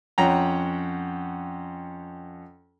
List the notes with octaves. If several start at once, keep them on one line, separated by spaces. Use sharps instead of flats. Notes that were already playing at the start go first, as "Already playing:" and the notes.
F2 C#4 F#5 G5 A#5